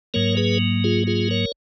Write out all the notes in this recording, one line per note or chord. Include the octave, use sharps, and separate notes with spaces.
G#2 F#3 A#3 A#4 C#5
G#4 B4
F4 G#4
F4 G#4
A#4 C#5